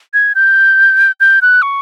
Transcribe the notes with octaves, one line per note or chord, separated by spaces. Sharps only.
G#6
G6
G6
F#6
C#6